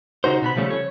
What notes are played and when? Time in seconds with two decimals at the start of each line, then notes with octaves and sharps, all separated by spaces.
0.24 C#3 D#4 F#4 C5
0.42 B2 B3 B5
0.57 C#3 F3 G3 A3 C#4
0.70 C#5